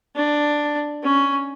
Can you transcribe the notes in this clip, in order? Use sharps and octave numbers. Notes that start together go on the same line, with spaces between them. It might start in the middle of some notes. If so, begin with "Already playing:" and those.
D4
C#4